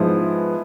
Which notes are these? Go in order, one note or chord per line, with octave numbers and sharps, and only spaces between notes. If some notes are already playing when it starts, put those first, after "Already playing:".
Already playing: G#2 F3 G#3 B3 E4